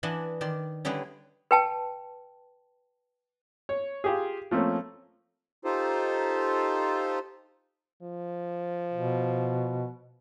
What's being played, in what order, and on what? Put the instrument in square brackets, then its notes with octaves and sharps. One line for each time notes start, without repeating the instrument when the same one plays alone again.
[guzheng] E3 D4 D#5 F#5 G#5 A5
D#3 D5 C6
D3 G3 C#4 E4 G#4 B4
[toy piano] B4 G5 A5
[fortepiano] C#5
F4 G4 G#4
F3 A3 A#3 C4 C#4
[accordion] D#4 F4 G4 A4 C5
[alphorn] F3
[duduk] B2